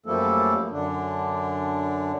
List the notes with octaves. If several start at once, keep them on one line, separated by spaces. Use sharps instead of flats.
F#2 F3 G3 A3 A#3 A4
F#2 D3 D4